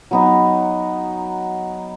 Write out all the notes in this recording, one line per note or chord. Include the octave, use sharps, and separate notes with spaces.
F#3 B3 D#4